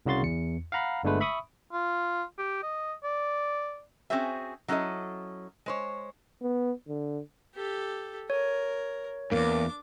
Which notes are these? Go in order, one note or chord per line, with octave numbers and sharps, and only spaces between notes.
C2 C#3 F#4 C6 A6
E2 C#7
F5 F#5 A#5 B5
G1 D3 G#3 A3 B4
E5 B5 C#6 D#6
F4
G4
D#5
D5
C4 C#4 F#4 G#4 C5 E5
F#3 C#4 E4 A4 D#5
G#3 C5 C#5
B3
D3
G4 A4
A#4 C#5
E2 G2 A#3 D4 D6